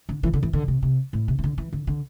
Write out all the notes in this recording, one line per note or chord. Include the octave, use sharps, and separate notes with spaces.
D3
E3
D3
E3
D3
C3
C3
A2
C3
E3
D3
E3
D3
D3